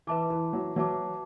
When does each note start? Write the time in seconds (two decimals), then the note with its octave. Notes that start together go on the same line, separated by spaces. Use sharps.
0.07 E3 B4 E5 A5 D6
0.30 E3
0.53 F#3
0.76 F#3 B4 E5 A5 D6